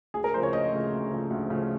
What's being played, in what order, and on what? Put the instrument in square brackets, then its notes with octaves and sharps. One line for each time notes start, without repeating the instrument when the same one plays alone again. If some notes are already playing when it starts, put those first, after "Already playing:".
[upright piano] D2 [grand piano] G#4
[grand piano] A#4
[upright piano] C#3 F3 A3 [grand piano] C5
[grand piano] C#5
[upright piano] D2 [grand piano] D#5
[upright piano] C#3 F3 A3
D2
C#3 F3 A3
D2
C#3 F3 A3